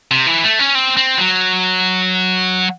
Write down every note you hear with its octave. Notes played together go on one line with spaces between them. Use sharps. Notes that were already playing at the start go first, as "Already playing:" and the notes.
C3
E3
A3
C#4
C4
C4
F#3